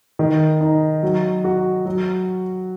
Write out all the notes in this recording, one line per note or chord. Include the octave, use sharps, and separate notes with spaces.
D#3
D#4
F#3
F#4
F#3